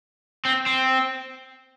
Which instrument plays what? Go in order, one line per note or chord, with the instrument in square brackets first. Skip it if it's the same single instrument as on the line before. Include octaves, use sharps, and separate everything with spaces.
[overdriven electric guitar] C4
C4